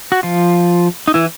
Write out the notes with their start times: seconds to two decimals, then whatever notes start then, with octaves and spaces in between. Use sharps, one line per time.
0.12 F#4
0.23 F3 F4
1.08 D#4
1.14 E3 E4